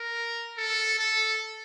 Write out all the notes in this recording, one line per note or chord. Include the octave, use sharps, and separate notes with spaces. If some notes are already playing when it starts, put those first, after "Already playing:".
Already playing: A#4
A4
A4